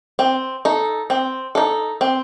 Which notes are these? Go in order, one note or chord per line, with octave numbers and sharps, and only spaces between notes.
C4
D#4 A4
C4
D#4 A4
C4